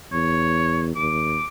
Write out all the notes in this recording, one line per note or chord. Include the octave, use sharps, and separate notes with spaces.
E2 C#5
D#2 D6